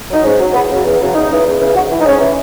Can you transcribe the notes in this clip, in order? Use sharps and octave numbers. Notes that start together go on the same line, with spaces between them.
F#3 D#4
G#2 C#4
F#3
E2 B3
C#3 F#3
E2
C#3 F#3
E2 D#4
C#3 E3
E2
C#3 E3
G#2 F#4
E3
D#4
G#2 C#4
E3